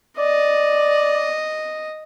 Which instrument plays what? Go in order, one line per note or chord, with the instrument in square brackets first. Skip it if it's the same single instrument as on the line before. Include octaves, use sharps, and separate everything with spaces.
[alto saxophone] D5 [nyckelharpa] D#5